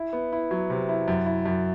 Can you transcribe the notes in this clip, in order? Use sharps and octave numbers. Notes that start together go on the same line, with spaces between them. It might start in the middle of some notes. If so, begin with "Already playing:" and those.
Already playing: E4
B3
E4
F#3
C3
E4
F#2
E4
F#2